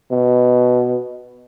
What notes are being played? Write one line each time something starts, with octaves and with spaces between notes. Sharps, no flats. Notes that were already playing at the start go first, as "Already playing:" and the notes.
B2